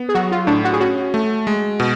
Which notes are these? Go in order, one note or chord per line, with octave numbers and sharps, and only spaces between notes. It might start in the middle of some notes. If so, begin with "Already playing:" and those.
Already playing: B3
G#4
F#3 F#4
F4
A2 D4
F#4
G#4
C#4 F#4
A3
G#3
B2